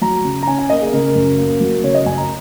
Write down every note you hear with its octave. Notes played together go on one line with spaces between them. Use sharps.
F#3 A#5
C#3
A#5
C#4 G#5
G#5
A#3 D#5
G#4
C#3 A#4
F#2
A#3
F#3
C#3 C#5
D#5
F#2 G#5
A#5